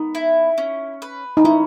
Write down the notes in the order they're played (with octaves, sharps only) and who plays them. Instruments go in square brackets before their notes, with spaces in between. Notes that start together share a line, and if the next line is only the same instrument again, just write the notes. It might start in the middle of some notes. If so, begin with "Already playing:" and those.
Already playing: [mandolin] B3 [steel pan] D#4
[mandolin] E4
C#4
B4
[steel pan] D#4
[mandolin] C#4 [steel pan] E4